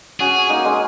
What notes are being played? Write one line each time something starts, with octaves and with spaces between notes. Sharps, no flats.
C#4 F#4 G#4
A#3 D#4
G#3 C#4